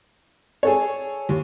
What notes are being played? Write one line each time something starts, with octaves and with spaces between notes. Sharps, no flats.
G#4 A4 C#5
D#2